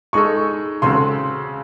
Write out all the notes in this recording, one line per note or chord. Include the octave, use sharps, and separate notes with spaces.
G#3 D#4 A4 C#6
C#3 G#3 C4 F#4 A4 C6